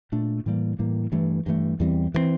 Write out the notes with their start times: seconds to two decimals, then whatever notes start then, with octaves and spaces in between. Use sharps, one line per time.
0.12 A#2 A3 D4
0.46 A2 E3 G3 A#3
0.79 A2 E3 G3 A#3
1.12 G2 E3 A3
1.46 G2 E3 A3
1.80 E2 E3 G3 C4
2.14 E3 G3 C4